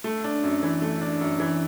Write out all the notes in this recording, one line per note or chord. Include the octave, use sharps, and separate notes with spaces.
A3
D4
F#2
E3
A3
D4
F#2
E3